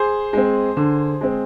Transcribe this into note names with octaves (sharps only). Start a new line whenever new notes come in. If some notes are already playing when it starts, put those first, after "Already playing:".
Already playing: G#4 C5
G#3 C4
D3
G#3 C4